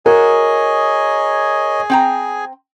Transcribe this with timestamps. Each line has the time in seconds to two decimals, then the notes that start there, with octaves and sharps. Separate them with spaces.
0.06 F#4 G#4 A#4 C#5 D#5 G#5
1.90 C4 G5 A#5